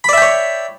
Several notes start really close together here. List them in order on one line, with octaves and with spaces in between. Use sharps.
B5 D5 E5 G5 C#5